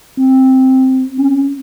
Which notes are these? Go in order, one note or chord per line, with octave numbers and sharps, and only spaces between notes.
C4
C#4